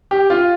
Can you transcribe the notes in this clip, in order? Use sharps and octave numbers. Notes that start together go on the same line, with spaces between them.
G4
F4